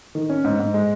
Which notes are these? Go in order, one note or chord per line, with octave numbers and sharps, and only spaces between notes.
D#3
C#4
G#2
G#2
G#3